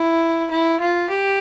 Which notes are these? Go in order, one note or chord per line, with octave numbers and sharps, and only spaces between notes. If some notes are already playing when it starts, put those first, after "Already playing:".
Already playing: E4
E4
F4
G4